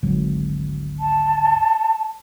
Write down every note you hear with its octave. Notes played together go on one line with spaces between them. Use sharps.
G#1 D2 F#3
A5